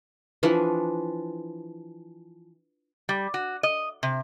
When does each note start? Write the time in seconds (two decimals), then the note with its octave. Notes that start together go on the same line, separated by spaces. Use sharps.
0.43 E3 F3 D4 F#5
3.09 G3
3.34 F#4
3.63 D#5
4.03 C3